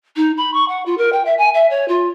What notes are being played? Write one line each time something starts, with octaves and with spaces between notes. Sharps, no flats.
D#4
B5
C#6
F#5
F4
A#4
G5
E5
G#5
E5
C#5
F4